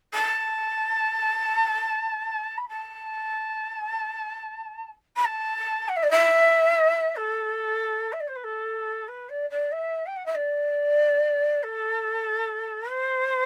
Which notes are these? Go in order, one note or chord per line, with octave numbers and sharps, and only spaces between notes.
A5
B5
A5
B5
A5
F#5
E5
D5
E5
A4
E5
D5
C5
B4
A4
B4
D5
D5
E5
G5
F#5
E5
D5
A4
C5